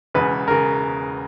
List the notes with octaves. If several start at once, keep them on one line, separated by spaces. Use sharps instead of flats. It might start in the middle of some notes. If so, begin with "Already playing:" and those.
E1 E2 C#3 B4
C#3 A#4